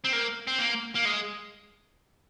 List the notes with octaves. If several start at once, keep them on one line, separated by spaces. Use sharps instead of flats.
C4
A#3
C4
A#3
A#3
G#3